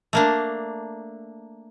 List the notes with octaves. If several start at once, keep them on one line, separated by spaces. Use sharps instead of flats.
A3 A#3 D4